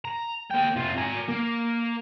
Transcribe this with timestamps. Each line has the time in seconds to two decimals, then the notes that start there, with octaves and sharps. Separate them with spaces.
0.05 A#5
0.50 A#3 G5
0.76 C3 F4
0.97 A#4 G#5
1.29 A#3